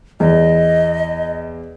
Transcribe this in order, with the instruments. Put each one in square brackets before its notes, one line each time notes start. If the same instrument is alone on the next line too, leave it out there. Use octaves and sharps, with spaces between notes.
[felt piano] E2 [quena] D#5